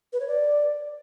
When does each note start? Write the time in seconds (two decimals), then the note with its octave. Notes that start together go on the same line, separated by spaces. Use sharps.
0.13 B4
0.20 C#5
0.27 D5